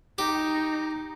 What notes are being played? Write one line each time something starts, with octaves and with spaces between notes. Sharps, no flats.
D#4 G4